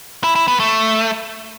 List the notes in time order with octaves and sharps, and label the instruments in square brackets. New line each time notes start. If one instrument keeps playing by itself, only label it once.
[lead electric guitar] E4
E4
B3
A3